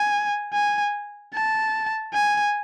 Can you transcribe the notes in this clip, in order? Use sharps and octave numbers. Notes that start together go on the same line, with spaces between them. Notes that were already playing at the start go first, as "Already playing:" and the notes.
Already playing: G#5
G#5
A5
G#5